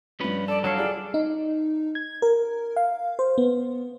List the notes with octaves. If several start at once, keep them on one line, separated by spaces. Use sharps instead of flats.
G2 F3 C#4 B4
A4 D5
F#3 D4 A4 C#5 F5
F4 G#4 D5
D#4
G#6
A#4
F5
C5
B3